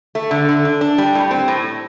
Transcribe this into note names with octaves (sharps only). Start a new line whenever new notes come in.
A3
D3
D3
D4
D4
G3
A2
C4
A2